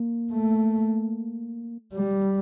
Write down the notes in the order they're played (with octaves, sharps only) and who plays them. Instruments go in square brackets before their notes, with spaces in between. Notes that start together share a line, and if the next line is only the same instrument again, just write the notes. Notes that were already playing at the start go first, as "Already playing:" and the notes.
Already playing: [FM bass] A#3
[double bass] A3
G3